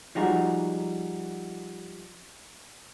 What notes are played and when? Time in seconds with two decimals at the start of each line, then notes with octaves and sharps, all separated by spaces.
0.15 F3 G3 G#3 D#4 F#4